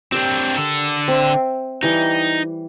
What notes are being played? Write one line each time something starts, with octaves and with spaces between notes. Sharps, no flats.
C4 D4 G4 A#4
D3 A4
C4 E5
E3 G3 D#4